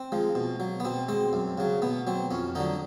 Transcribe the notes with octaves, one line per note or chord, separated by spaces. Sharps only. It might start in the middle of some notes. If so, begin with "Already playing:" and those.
Already playing: C4
F3 G#3
B2
F#3
B3
B2 C4
G#3 C4
F#2
C#3 F#3
B2 B3
F#3 C4
F2 C#4
D3 F#3 D#4